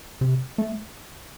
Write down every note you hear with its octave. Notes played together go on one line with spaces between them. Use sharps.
C3
A3